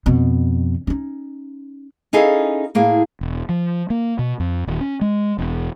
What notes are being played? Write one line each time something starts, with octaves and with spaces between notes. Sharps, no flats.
F2 B2
C#4 D#4
C#4 D#4 E4 G#4 A4 F5
A2 A#3 G#4
E1
F3
A#3
B2
F2
D#1
C#4
G#3
E1